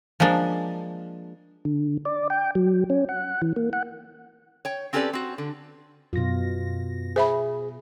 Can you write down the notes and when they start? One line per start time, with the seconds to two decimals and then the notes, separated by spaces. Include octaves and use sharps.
0.20 F3 G#3 A#3 D4
1.65 D3
2.05 D5
2.30 G5
2.55 F#3
2.90 C#4
3.09 F#5
3.42 E3
3.56 A#3
3.73 F#5
4.65 C#5 G5
4.93 C4 C#4 G4 A4 B4 D5
5.13 C4 F#4
5.38 D3
6.13 F#2 B2 F4 A#6
7.16 G#4 C5 E5 B5